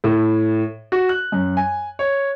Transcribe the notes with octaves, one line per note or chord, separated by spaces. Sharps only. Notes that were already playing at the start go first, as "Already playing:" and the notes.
A2
F#4
F#6
F#2
G#5
C#5